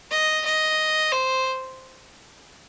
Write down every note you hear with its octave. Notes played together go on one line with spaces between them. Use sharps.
D#5
D#5
C5